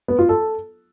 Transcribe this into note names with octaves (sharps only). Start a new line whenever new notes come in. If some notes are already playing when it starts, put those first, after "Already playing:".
B3
F4
A4